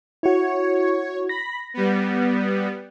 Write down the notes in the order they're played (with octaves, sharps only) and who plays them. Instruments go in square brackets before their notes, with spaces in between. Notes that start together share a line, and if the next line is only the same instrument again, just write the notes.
[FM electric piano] E4 F#4 [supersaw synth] C#5
[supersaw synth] B5 [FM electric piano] A#6
[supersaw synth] G3 B3